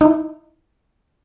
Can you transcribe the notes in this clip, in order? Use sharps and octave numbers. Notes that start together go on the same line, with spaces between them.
D#4 E4